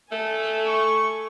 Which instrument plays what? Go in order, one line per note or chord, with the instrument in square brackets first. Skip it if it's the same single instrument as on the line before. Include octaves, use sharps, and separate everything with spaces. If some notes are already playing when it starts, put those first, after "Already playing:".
[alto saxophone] A3 [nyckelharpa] A4 G#5
[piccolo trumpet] C#6